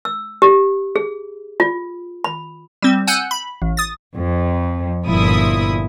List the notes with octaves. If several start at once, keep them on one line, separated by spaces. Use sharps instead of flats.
E6
G4
G#4
F4
B5
G3 C4
F#5 G#5 E6 F#6 G6
B5
A1
D#6 A6
F2
G1 A#2 F3 E4 D#6